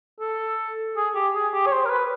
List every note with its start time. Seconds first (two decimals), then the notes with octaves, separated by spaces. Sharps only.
0.20 A4
0.97 G#4
1.15 G4
1.35 G#4
1.53 G4
1.66 C#5
1.72 C5
1.85 A#4
1.90 B4